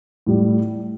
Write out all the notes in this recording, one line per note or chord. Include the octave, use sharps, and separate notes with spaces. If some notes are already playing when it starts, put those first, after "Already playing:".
A2 G3